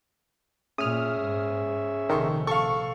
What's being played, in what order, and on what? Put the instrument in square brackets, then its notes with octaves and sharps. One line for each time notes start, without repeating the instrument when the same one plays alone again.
[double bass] A#2 [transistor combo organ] C#4 G#4 E5 [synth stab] D#6 F6
[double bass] G#2
[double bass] A#1 C3 [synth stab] D#3 [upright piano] A4 C6 C#6
[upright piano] A4 F5 [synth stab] C#6